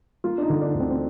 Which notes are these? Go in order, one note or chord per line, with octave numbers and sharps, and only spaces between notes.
A#3 F4
D4
D#4
D3
D4
D2
C4
C4